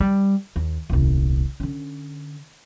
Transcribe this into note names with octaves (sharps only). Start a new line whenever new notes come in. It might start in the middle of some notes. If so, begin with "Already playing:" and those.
G3
D#2
D#1 C2
D3 C#4